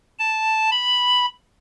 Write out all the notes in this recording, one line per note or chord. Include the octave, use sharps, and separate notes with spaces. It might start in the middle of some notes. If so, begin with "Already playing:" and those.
A5
B5